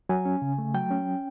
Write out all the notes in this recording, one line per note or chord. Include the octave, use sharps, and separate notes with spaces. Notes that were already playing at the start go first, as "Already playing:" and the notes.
F#3 G#5
C#4
C#3
A3
F#3 G5
C#4